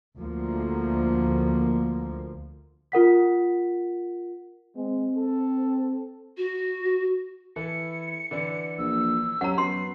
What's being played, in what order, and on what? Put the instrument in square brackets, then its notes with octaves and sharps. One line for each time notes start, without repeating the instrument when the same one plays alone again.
[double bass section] D2 F3 A#3
[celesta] F4 A#4 F#5 B6
[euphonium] G#3 [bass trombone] C4
[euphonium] A4
[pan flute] F#4
[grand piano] E3 E4 A4 [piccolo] C#7
[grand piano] D3 E3 D4
[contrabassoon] A#1 [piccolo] E6
[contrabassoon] F#2 [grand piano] C#4 G4 [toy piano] F#5 A#5
[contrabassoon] F#2 [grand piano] B3 [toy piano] C6 [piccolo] C7